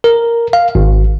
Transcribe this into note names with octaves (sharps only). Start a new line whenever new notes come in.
A#4
F5
G#1